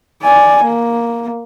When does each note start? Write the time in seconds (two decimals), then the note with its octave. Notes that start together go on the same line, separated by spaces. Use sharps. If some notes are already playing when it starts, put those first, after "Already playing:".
0.23 D5 G#5
0.64 A#3